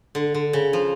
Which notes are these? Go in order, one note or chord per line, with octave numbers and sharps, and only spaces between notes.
D3
D3
C#3
F3